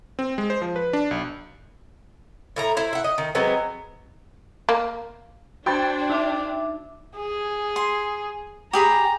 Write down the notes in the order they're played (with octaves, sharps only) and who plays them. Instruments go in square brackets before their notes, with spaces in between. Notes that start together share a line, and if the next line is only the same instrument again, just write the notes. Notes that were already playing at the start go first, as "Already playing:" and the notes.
[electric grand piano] C4
G#3
C5
F3
B4
D4
B1
[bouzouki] A2 E4 A#5
E4 C5
E5 F#5
D#5
D#3
F#3 G#3 B3 C4
[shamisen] A#3
[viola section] D4 [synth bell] F#4 C5 G#6 [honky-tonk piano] G5 C6 A6
[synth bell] D#4 E5 D6
[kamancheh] G#4
[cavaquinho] C6
[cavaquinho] G4 G#4 B5 [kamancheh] A#5